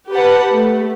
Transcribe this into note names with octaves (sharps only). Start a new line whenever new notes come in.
G4 B4 F#5 A5
A3